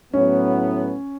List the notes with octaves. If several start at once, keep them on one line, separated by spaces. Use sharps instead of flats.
A2 F#3 B3 C#4